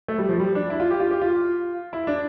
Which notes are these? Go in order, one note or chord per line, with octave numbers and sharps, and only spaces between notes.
A3
G3
F3
G3
D4
E4
F4
G4
F4
G4
F4
E4
D4